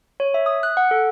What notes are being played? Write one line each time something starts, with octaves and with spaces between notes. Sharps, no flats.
C#5
E5
D#6
F#6
F#5
A4